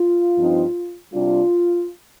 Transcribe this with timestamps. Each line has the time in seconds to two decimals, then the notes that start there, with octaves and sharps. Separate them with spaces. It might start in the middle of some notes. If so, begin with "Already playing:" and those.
Already playing: F4
0.35 G2 F3 C4 D#4
1.13 C3 G3 D4 F4